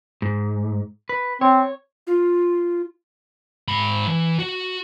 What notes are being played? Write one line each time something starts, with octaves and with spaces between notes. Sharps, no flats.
G#2
B4
C4 C#5
F4
G#2 B5
E3
F#4